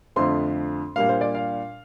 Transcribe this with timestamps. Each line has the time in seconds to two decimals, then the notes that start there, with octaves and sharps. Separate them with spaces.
0.16 F2 D3 F3 A3 C4 C6
0.96 A#2 G3 A#3 D4 F5
1.09 C5
1.21 D5
1.35 F5